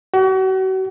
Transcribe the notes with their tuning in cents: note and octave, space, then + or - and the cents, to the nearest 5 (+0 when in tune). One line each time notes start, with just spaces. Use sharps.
F#4 +40